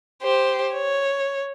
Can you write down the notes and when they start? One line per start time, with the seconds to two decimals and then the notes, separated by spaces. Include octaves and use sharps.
0.23 G4 C5
0.74 C#5